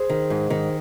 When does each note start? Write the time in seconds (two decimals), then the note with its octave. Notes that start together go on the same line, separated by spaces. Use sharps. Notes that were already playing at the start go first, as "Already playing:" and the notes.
Already playing: G#4 C5
0.10 D#3
0.30 G#2
0.50 D#3